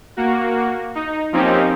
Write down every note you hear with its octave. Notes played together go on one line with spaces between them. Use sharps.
A#3 F#4
D#4
F3 A#3 C4 C#4 D#4 G4